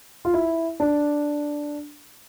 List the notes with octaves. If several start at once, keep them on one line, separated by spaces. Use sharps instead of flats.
F4
E4
D4